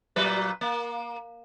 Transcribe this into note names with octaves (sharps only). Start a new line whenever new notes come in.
A#2 F#3 B4
A#3